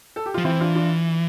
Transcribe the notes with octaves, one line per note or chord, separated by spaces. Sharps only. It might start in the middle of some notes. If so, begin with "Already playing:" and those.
A4
G4
F3 F4
E3 C4 E4
D4 F4
D4 F4